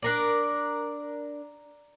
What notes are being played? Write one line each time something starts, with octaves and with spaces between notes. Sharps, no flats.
D4 A#4 D5